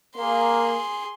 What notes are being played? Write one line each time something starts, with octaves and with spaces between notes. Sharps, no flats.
A#3 G#4 C6